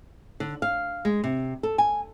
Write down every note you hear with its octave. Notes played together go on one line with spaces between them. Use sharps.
D3
F5
G#3
C3
A4
G#5